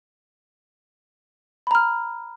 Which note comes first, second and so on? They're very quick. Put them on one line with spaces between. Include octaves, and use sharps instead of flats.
B5 A#5 F6